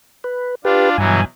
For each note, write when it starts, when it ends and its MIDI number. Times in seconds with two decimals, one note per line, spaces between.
0.24 0.55 71
0.65 0.96 62
0.65 0.96 65
0.65 0.90 67
0.65 0.90 71
0.98 1.25 43
0.98 1.20 47
0.98 1.20 52
0.98 1.20 54
0.98 1.25 80